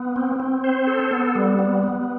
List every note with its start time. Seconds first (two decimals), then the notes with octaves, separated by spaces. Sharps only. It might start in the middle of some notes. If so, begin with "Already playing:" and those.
Already playing: B3
0.16 C4
0.40 C4
0.64 C5
0.87 A4
1.11 B3
1.35 G3
1.59 B3
1.83 B3